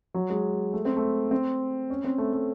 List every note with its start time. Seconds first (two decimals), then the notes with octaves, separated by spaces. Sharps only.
0.14 F#3
0.30 G#3
0.73 A3
0.85 C4
0.96 A3
1.31 C4
1.90 C#4
2.04 C4
2.18 A3
2.33 A3